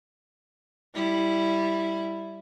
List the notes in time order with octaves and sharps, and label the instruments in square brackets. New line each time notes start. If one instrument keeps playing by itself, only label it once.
[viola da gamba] G3 E4